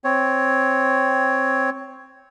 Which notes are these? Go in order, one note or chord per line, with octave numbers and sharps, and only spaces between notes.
C4 C#5